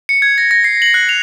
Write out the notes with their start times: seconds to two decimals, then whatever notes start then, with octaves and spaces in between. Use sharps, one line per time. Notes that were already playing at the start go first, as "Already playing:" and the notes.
0.09 C#7
0.22 G#6
0.38 A#6
0.51 A#6
0.64 C7
0.82 F#7
0.94 F#6
1.09 F7